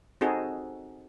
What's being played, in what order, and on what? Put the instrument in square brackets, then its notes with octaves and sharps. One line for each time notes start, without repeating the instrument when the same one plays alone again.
[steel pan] C4 D#4 F#4 G#4 A4